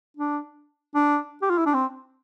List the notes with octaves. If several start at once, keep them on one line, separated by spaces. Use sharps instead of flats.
D4
D4
G4
F4
E4
D4
C4